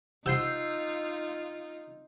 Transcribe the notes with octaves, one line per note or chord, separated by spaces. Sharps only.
C3 D#4 F4 F#5 G#5 E6 G6 C7